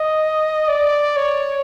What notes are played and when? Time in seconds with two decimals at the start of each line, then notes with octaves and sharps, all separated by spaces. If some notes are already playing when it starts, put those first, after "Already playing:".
Already playing: D#5
0.68 D5
1.16 C#5